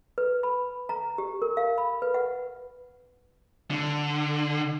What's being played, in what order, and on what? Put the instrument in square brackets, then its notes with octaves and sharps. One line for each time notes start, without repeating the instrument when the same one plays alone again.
[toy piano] B4
B5
A#5
G4
A#4
F5
B5
B4
F#5
[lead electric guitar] D3